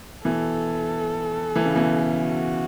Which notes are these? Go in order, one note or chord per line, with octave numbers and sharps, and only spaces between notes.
B2 E3 A4
E3
C#3
B2 E3
F#4